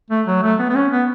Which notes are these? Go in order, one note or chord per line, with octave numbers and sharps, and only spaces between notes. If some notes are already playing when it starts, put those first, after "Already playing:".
A3
F#3
A3
B3
B3
C#4
B3